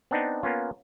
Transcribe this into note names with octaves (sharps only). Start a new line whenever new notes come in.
B3 C4 D4 D#4
A#3 B3 C#4 F4